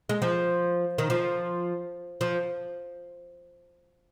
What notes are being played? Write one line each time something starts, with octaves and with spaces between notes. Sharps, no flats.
G#3
F3
D#3
F3
F3